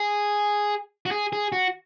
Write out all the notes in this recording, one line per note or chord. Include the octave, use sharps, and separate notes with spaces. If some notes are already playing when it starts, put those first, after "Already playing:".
Already playing: G#4
F#4
G#4
G#4
F#4